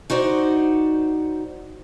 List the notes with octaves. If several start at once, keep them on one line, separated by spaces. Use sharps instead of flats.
D#4 F#4 C5 D5